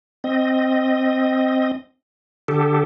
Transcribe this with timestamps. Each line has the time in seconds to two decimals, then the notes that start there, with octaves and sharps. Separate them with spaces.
0.24 C4 D#5
2.48 D3 G4 A4